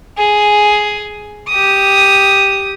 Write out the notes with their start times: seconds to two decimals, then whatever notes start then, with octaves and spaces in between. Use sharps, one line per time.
0.18 G#4
1.48 G4 D#6